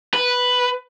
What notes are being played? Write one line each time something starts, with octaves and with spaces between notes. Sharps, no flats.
B4